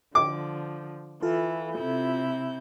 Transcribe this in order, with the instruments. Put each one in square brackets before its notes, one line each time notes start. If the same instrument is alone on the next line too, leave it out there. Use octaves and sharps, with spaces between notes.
[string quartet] D3 F3 [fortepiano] D6
[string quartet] E3 [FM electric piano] F4 A4
[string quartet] C3 E4 G6